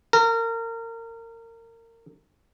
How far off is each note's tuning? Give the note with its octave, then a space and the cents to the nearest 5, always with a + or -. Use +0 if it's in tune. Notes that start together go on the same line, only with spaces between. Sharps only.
A#4 -30